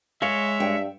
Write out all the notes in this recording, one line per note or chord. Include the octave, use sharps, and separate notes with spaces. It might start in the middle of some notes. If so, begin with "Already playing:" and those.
G#3 C#5 E5 F5
G2 G5